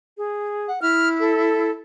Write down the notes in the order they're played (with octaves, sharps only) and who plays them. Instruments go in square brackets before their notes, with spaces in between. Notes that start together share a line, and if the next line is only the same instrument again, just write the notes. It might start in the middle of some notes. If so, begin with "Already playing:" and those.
[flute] G#4
[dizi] F#5
[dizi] E4 [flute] F6
[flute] A4